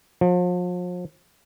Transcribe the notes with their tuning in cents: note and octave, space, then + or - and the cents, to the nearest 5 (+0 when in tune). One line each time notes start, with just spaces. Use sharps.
F3 +40